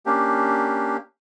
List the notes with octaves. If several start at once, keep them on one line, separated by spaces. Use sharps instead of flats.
A#3 C#4 D4 G4